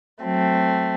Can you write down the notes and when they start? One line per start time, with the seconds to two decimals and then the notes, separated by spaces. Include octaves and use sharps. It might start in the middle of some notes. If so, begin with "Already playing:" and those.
0.22 F#3 A3 C4